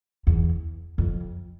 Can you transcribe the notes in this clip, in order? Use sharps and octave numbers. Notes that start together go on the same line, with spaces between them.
E2
F2